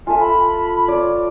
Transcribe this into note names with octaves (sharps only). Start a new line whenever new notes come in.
F4 A4 E5 G#5
B5
F4 C#5 D5